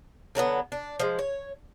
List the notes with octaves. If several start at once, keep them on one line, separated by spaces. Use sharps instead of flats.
D3 F#3 A#3 B3
D4
F3 G#3
C#5